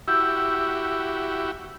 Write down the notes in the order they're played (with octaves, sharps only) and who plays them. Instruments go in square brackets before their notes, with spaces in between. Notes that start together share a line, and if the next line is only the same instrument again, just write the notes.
[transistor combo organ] E4 F#4 G4 [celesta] E6 G6